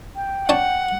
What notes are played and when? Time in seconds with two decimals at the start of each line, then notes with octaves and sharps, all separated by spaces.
0.15 G5
0.49 D4 C#5 F#5 A5